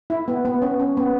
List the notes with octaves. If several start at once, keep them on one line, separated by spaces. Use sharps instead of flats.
E4
B3
B3
C#4
C#4
B3